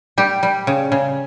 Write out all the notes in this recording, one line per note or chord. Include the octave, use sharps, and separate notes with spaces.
G3 G4
G3
C#3
C#3